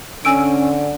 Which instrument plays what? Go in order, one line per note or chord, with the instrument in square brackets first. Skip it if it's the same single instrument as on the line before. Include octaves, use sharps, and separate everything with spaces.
[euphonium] D3 [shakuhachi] C#4 [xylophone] G#5 E6 D7